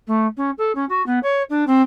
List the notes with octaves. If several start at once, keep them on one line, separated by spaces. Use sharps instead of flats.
A3
C#4
A4
C#4
F#4
B3
C#5
D4
C4